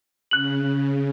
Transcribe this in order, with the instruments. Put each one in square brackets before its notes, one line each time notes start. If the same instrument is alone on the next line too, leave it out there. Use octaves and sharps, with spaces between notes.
[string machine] C#3 [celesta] F#6 F#7